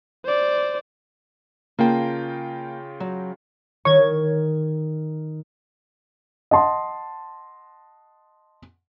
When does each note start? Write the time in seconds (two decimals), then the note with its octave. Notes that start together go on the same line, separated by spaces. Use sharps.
0.25 C5 D5
1.79 C#3 A#3 F4 G5 A5
3.00 F#3
3.85 D#3 C#5 G#6
6.51 D#5 F#5 A5 C6